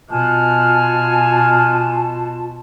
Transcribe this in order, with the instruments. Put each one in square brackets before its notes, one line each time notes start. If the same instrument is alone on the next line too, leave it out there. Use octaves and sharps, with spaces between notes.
[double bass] B2 [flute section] F4 A5 [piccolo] G#5 [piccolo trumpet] F6